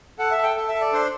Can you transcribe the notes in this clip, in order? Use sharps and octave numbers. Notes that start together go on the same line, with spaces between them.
A4 F#5
E5
A4
G5
A4
E5
A4
D5
D4 C5